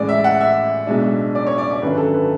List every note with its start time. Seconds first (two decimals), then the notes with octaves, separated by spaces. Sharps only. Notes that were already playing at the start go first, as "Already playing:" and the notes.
Already playing: A1 A2 G#3 D5
0.09 E5
0.24 F#5
0.41 E5
0.87 B1 B2 G#3 D4
1.35 D5
1.47 C#5
1.58 D5
1.71 D5
1.82 G#1 F#2 D3 B4
1.98 A4
2.14 B4